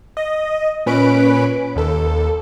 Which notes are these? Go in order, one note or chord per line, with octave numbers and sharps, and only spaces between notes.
D#5
A#2 C#4 B4 B5 D7
D#2 A4